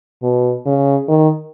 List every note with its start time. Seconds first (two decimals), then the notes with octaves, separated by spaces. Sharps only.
0.22 B2
0.66 C#3
1.08 D#3